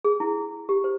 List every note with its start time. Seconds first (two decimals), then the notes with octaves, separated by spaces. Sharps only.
0.05 G#4
0.20 E4
0.69 G4
0.84 C5